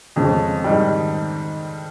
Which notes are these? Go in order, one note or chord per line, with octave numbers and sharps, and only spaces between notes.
F2 C#3 G#3
G#2 D#3 G3